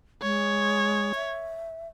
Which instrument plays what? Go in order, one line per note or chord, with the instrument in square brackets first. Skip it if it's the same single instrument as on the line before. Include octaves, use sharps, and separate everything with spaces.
[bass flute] G#3 [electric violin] C#5
[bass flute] E5